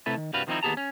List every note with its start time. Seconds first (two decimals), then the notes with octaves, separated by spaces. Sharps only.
0.06 C3 A3 E4 A4 B4
0.17 D#3
0.33 C2 G2 G3 F#4 B4 F5
0.47 D#3 F3 C4 C#4 D#4 E4
0.63 D#2 B3 G4 G#4 A5 A#5
0.77 C#4